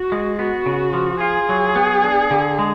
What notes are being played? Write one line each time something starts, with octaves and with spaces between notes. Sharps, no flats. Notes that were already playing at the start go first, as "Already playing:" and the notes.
Already playing: F#4
G#3
B3 F#4
C#3
F3
F4 G#4
F#3
B3
D4
D3
G#3